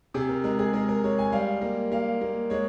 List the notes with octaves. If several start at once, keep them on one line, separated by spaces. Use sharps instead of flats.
C3 G#4
A#4
G#3 A#4
G#4
G#3 A#4
A#4
G#3 C#5
G#5
G3 F5
A#3
A#3 F5
A#3
G#3 C#5